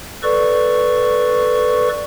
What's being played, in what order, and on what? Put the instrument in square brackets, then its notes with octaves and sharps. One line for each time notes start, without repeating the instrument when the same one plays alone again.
[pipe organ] A4 B4 D5 C#6